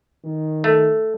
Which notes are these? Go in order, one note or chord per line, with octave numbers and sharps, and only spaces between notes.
D#3
A3